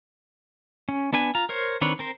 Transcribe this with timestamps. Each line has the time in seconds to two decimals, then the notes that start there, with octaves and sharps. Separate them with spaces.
0.89 C#4
1.13 B3 D4 B4 G#5
1.35 F4 A#5
1.49 A#4 C5 C#5
1.81 D#3 C4 D4 B4 C#5
1.99 C4 A#4 C5